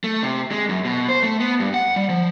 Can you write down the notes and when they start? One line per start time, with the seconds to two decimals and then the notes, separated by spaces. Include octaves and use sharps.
0.04 A3
0.23 C3
0.52 G#3
0.69 F#2
0.85 B2
1.09 C5
1.23 A3
1.40 B3
1.60 G2
1.74 F#5
1.96 G3
2.09 F3